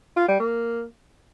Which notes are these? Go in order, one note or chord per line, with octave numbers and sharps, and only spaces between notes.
F4
G3
A#3